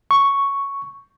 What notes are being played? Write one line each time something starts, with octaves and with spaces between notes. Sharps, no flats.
C#6